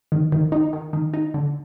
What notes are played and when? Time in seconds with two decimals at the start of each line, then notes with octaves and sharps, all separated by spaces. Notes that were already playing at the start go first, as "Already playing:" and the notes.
0.12 D#3
0.32 D#3
0.52 D#4
0.73 D#3
0.93 D#3
1.14 D#4
1.34 D3